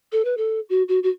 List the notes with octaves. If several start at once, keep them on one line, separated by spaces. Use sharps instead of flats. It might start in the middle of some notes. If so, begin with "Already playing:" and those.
A4
B4
A4
F#4
F#4
F#4